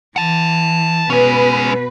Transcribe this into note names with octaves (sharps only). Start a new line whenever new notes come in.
E3 F#5 A5
B2 G#3 C#4 B4